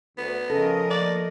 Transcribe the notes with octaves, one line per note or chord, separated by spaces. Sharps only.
D2 B3
C#3 F3 A4 A#4 D#5
D3 A3 A#3 D5